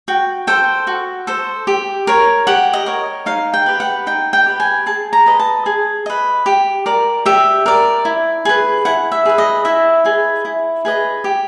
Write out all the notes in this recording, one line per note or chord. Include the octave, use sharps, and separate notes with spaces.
F#4 G5
A4 C5 G5
F#4
A4 C5
G4
A#4 C#5
G4 F#5
D#5
A#4 C#5
D#4 F5
G5
G4 B4
F#5
D#4 G5
G5
G4 B4
G#5
G#4 A5
A#5
B4 D#5
A5
G#4
B4 D#5
G4
A#4 D5
G4 E5
A#4 D5
E4
G#4 B4
E4 F#5
E5
G#4 B4
D#5
E4 E5
G#4 B4 D#5
E4
G#4 B4 D#5
G4